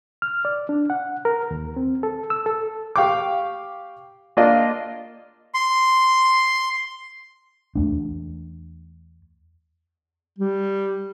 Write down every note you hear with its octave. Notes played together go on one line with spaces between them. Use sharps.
F6
D5
D4
F#5
A#4
D#2
C4
A4
E6
A4
G4 F5 G5 C#6 D6
A#3 D4 F4 D5 D#5
C6
E2 A3 D4
G3